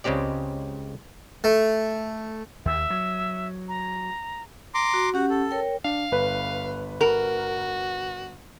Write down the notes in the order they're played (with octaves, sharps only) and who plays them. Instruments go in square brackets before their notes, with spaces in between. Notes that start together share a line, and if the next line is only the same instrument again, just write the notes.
[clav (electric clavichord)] C#2 C#3 G#3 C4 G4 D5
[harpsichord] A3
[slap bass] D#2 [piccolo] E5
[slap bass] F#3
[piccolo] A#5
[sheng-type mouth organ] A#5 C6 D6
[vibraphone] F#4
[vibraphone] C#4 G4 F#5 [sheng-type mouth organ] F#4
[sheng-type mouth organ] A4
[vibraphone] A#4 C#5 G5
[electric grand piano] D4 [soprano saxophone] F5
[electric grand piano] G1 B4
[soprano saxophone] F#4 [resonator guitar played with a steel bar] A#4